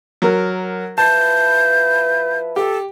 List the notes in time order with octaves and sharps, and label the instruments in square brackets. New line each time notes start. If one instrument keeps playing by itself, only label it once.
[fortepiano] F#3 A#4
[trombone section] F3 E4 B4 [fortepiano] A5 [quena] G6
[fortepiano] G4 [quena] A4